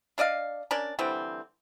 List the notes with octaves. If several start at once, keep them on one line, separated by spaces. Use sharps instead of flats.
D4 D5 D#5 F5
C#4 D4 A#4 D5
D3 E3 G3 C4